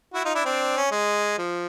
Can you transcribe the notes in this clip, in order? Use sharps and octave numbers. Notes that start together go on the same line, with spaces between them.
E4 F#4
D#4 F4
D4 E4
C4 D4
C#4
G#3
F3